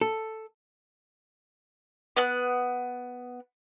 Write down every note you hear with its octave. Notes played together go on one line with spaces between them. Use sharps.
A4
B3 F#6